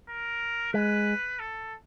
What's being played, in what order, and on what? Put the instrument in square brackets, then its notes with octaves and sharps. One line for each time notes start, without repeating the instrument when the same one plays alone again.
[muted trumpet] A#4
[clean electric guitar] G#3 [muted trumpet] B4
[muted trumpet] A4